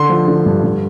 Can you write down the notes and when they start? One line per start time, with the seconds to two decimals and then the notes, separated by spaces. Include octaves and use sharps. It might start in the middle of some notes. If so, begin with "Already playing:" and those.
Already playing: D3 C6
0.10 F3
0.28 D3
0.46 G2
0.64 G2